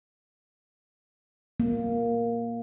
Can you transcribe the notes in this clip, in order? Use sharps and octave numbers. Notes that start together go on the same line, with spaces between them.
A#3